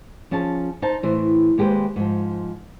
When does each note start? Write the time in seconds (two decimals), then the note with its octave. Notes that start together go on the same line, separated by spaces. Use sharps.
0.31 F3 C#4 G#4 A5
0.82 D#4 C5 A5
1.03 A2 E3 C5
1.58 D#2 G#3 G4 B4 C5
1.96 G#2 F3